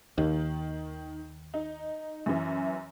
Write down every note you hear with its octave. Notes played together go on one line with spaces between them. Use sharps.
D#2 D#3
D#4
F#2 E3